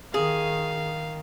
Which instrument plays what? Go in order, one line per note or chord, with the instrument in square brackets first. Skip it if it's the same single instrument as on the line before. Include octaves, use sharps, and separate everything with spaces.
[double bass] D#3 [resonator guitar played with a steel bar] G#4 [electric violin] F5